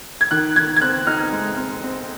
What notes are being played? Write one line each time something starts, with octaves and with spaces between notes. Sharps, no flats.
G#6
D#3 F#6
D#3 G#6
G#6
C4 F#6
D#4 F6
G#3
C4
C4